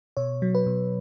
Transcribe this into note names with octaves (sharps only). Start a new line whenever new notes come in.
B2 C#5
F#3
B4
B2